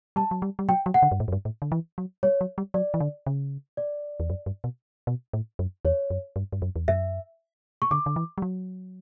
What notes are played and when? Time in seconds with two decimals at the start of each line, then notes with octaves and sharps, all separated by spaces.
0.16 G3 A5
0.31 F#3
0.42 G3
0.59 G3
0.69 F#3 G5
0.86 F#3
0.94 F#5
1.02 D3
1.11 G2
1.20 A2
1.28 F#2
1.32 G2
1.45 A2
1.62 D3
1.72 E3
1.98 F#3
2.23 G3 C#5
2.41 F#3
2.58 G3
2.74 F#3 D5
2.94 E3
3.00 D3
3.27 C#3
3.77 D5
4.20 E2
4.30 F#2
4.46 G2
4.64 B2
5.07 B2
5.33 A2
5.59 F#2
5.85 E2 C#5
6.10 F#2
6.36 G2
6.53 G2
6.62 F#2
6.76 E2
6.88 F#2 E5
7.82 C#6
7.91 D3 D6
8.06 D3
8.16 E3
8.38 G3
8.42 F#3